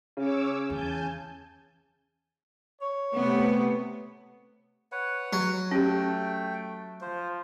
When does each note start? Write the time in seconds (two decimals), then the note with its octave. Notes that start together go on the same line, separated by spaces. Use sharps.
0.17 C#3 C#5 D6 E6
0.70 E2 G#5 A5 G6
2.81 C#5
3.12 C3 A3 B3
4.92 B4 C#5 F#5
5.33 F#3
5.71 A3 C#4 G4 G5
7.02 F3 C5